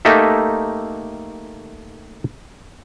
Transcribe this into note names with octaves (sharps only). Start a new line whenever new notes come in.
A3 A#3 D#4 G4 A4 E5